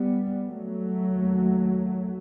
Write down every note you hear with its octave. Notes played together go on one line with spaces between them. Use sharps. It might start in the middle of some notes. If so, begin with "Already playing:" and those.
Already playing: G3 B3
F#3 A3
D#2